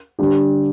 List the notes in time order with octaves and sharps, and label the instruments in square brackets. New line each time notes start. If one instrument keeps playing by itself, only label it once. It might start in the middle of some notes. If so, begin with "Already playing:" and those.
[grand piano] D3 G3 D4 G4